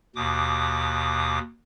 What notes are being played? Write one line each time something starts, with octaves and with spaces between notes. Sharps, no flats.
D#2 B2 D6 D#6